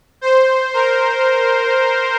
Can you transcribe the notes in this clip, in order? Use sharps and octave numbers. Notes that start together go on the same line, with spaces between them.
C5
A#4